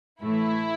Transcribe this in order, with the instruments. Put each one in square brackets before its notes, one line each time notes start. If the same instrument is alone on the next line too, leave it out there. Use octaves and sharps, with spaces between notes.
[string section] A2 E3 A3 [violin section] E4